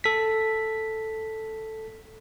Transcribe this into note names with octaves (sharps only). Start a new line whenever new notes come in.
A4 B6